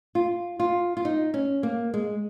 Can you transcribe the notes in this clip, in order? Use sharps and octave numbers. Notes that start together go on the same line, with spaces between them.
F4
F4
F4
D#4
C#4
A#3
G#3